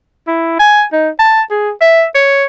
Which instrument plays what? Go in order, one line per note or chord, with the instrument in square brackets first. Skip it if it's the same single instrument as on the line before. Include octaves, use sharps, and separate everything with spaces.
[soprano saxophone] E4
G#5
D#4
A5
G#4
E5
C#5